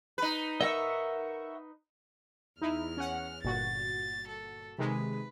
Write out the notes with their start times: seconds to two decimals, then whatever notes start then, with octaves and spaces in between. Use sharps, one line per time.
0.18 D#4 B4
0.61 A#4 D#5 E5 F#5 C#6 E6
2.62 E2 D#4 E4 F6
2.97 C#4 F#5
3.44 G1 A#2 F#4 A6
4.29 A4
4.79 C3 D#3 G#3 B4